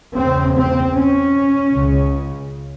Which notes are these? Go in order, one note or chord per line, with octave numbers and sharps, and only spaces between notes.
E2 C#3 C4
C4
C#4
C#2 C#3